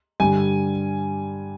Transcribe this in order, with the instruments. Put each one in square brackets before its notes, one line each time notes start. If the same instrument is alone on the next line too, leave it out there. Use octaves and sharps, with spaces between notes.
[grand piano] G2 D3 G3 G#5